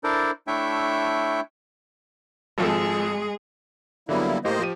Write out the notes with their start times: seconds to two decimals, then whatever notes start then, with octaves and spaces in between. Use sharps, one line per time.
0.04 D4 E4 A4 A#4 C5 D5
0.47 A3 D4 E4 C#5 E5 G5
2.58 G#1 F3 G#3 G#4 A4
4.09 D3 F#3 G3 A#3 B3 E4
4.45 A2 A#3 G4 C5 D#5
4.59 F3 G4 D#7